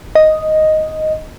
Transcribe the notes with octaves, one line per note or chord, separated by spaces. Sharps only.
D#5